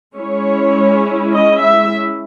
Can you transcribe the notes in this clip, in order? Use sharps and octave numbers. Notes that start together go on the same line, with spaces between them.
G#3 C#4 E4 C#5
D#5
E5